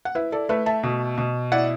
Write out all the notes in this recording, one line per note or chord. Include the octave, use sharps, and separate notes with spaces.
F#5
E4 B4 E5
A4 D5
A3 B4 E5
E5 A5
B2
B2
E4 D5 F#5